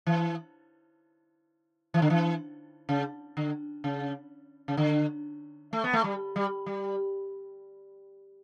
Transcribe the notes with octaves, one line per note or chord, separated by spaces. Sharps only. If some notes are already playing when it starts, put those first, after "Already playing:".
E3
E3
D3
E3
C#3
D3
C#3
C#3
D3
A3
B3
A3
G3
G3
G3